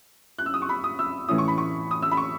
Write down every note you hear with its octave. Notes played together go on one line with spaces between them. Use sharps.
F#6
E6
D#6
C#6
B5
D#6
E6
A2 E3 A3 C#4 E4 D#6
C#6
B5
C#6
D#6
E6
B5
C#6